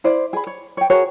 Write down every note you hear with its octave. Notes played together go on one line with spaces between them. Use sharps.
E4 C5 D5
G#4 B5
C#5
C#5 G5
F#4 G#4 A#4 C#5